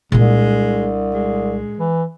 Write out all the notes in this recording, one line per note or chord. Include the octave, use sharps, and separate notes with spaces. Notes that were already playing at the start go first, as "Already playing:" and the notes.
C2 A#2 G#3 D4
G#3
E3